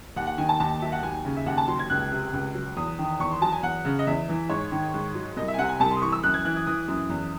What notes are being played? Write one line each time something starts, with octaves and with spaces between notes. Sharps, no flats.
D#2 F#5
F#5
D#3 G#5
A5
D#2 A5
F#3 E5
F#5
D#2 G#5
C#3
E5
D#2 F#5
A5
F#3 C6
G#6
C#2 F#6
C3
C#2
F#3
E2 D#6
D#3
E2 C#6
C6
F#3 A5
G#5
E2 F#5
C#3
D#5
E2 E5
E3
G#2 C#5
D#3
G#2
F#3
C2 D#5
E5
G#5
C3 F#5
G#5
C2 A5
C6
D#6
E3 C#6
E6
F#2 F#6
G#6
E3 F#6
D#6
E3 D#6
F#2
E2